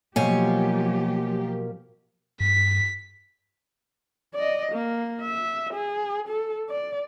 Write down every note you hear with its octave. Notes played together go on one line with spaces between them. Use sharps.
B2 F3 F#3 A#3 G4 C5 C#5 G#5
G2 B6
D5 D#5
A#3
E5
G#4
A4
D5